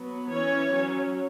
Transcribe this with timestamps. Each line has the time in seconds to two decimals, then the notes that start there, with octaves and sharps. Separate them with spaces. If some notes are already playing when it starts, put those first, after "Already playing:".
Already playing: F#3 B3
0.30 E3 C#4 C#5
0.70 F#3 C#4